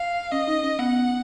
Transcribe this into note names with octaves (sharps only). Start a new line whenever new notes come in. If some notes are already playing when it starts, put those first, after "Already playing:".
Already playing: F5
C#4 D#5
D#4
C#4
B3 F#5